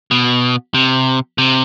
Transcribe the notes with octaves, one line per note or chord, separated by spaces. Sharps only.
B2
C3
C3